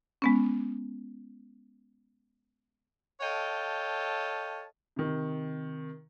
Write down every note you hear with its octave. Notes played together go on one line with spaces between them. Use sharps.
G#3 B3 C#4
A4 C#5 D#5 F5 G5 A5
C3 D#3